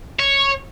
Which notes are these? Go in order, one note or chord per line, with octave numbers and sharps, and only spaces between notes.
C#5